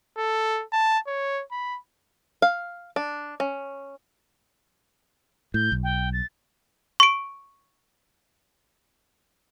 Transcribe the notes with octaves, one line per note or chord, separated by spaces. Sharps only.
A4
A5
C#5
B5
F5
D4
C#4
A2 G6
B1
G5
A6
C#6 D7